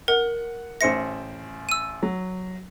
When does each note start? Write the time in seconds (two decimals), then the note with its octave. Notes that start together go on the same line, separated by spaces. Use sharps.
0.08 A#4 F#5
0.81 A1 C5 E5 A#6 C#7
1.69 E6 D#7
2.03 F#3